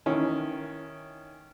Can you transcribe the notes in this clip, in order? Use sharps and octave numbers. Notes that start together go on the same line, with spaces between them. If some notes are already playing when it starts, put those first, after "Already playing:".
D#3 E3 C#4